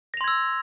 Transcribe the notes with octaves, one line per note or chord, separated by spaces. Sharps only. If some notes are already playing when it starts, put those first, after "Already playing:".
C6 E6 G#6 A#6 F7